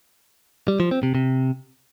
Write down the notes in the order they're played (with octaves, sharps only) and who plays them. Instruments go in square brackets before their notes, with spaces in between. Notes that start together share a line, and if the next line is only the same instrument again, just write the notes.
[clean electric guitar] G3
F3
C4
C3
C3